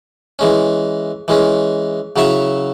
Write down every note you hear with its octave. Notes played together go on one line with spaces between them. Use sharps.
E3 G#3 C#4
E3 G#3 C#4
C#3 F#3 E4 C#5 E5